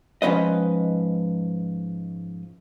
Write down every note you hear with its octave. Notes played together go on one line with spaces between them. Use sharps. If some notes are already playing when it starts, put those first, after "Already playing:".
G#2 F3 C#4 B4 D#5